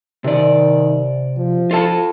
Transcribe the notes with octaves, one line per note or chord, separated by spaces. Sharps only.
C3 D#3 D5
F3
F4 A4 A5